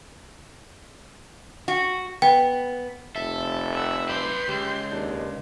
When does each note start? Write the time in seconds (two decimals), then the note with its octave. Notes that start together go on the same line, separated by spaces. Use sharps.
1.68 F#4
2.22 B3 G5
3.16 F1 A4 E5
3.74 F#5 E6
4.09 B4 D5 C6 G6
4.48 C#2 G4
4.91 D#2 D4